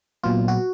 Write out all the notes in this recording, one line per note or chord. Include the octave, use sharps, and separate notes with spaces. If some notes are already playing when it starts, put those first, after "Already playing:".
A#2 F#3 B3 F4
F#4